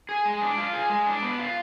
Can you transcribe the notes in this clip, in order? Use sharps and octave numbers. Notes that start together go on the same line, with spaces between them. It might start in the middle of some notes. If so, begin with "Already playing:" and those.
G#4
G#3
D4
F4
G#4
G#3
D4
B3
F4